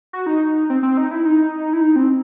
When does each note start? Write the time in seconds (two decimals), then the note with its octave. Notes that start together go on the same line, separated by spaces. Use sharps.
0.13 F#4
0.26 D#4
0.70 C4
0.83 C4
0.97 D#4
1.11 E4
1.26 D#4
1.73 E4
1.81 D#4
1.96 C4